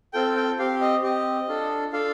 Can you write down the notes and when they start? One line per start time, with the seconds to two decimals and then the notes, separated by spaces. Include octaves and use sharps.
0.13 C4 F4 A4 G5
0.36 G5
0.59 C4 G4 F5
0.81 D#5
1.03 C4 G4 D#5
1.48 D4 F4 A4
1.92 D4 F4 A4 F5